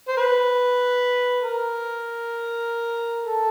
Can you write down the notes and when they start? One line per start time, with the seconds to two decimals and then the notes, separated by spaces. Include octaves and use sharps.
0.08 C5
0.17 B4
1.40 A#4
3.23 A4